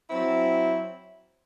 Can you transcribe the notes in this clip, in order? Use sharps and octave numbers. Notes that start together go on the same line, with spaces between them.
F#3 C4 E4